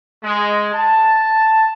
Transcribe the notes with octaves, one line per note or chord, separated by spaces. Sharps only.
G#3
A5